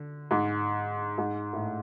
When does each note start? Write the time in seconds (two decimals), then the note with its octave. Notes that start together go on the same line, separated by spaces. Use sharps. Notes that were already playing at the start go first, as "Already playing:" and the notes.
Already playing: D3
0.31 G#2
1.18 G#2
1.53 A2